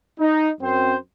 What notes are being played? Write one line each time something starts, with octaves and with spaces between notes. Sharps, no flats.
D#4
F#2 C4 C5